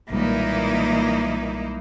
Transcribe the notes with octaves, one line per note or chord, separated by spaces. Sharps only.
B1 A#2 E3 G3 G#3 A#3 D#4 E4